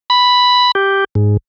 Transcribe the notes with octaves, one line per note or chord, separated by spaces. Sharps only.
B5
G4
G#2